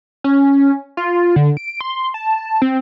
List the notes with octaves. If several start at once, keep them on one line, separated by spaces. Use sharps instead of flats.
C#4
F4
D3
D7
C6
A5
C4